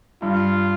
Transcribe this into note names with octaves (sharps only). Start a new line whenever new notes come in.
G2 F4